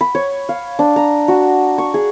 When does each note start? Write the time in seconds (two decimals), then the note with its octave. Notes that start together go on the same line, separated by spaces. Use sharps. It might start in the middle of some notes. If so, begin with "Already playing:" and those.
0.01 B5
0.15 C#5
0.49 F5
0.79 D4
0.96 A#5
1.28 F#4
1.78 C#6
1.94 G#4